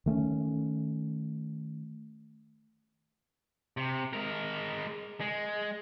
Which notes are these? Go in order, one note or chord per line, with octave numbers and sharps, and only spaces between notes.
D#3 A3 B3 C#4
C3
G#3 A#4
G#3